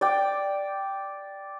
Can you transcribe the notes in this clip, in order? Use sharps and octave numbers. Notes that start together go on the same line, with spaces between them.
D5 G5